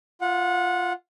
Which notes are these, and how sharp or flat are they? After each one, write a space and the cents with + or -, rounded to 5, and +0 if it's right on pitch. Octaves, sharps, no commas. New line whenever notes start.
F4 +0 F#5 -25